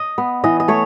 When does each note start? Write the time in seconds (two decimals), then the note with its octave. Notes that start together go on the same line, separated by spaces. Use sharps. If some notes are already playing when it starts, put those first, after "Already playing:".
Already playing: D#5
0.18 B3
0.44 E3 D#5
0.60 D#5
0.68 A3 C#5